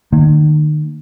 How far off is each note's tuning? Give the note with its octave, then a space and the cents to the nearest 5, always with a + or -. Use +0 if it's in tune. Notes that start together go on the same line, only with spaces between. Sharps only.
D#3 -40 A#3 -45